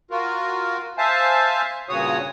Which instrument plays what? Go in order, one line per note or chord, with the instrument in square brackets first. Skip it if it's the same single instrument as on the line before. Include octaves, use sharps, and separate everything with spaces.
[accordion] F4 F#4 A#4
C5 E5 F5 G#5 A5
G2 A#2 C#3 F#4 C#5 D#6